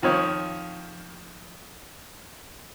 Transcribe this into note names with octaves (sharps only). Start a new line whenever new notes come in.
F2 D#3 F3 C#5 C#6